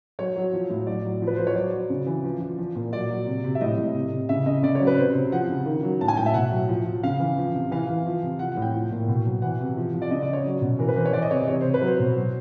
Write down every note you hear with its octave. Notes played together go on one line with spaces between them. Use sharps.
F#3 C#5
F#3
F3
A2
F#3 D5
F#3
F3
B4
F3 C5
C#5
F#3 D5
F#3
C#3
E3
F3
F3
F3
A#2
F#3 D5
F#3
C3
C3
E5
A2 D#5
A2
C3
C3
C#3 E5
C#3 D#5
C#3 D5
C#5
F#3
B4
C3 C5
C3
F3 F#5
C#3
D#3
F#3
A2 A5
G#5
A2 G5
E5
B2 F#5
F#3
F3
F3
C#3 F5
E3
F3
C3
E3 F5
E3
F3
C3
F3 F#5
F#5
A2
G5
F3
A#2
B2
F#3
E3 F#5
C3
F3
F3
D5
C#3 D#5
D5
C#3 C#5
F#3
B2
E3 A#4
B4
E3 C5
C#5
E3 D5
D#5
C3 C#5
C3 C#5
C3 C5
B4
F#3
C5
B2
F#3